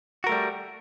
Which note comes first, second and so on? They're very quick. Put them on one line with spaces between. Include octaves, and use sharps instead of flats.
F#4 A#4 A3 G3